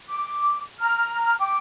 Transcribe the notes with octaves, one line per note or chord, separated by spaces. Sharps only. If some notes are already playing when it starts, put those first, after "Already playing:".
D6
A#5 F6
G5 D6